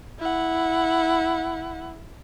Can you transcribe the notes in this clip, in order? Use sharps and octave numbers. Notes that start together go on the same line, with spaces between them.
E4 F#5